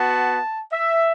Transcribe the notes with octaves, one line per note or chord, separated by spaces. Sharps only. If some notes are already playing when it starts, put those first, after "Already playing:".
Already playing: B3 F#4 A5
E5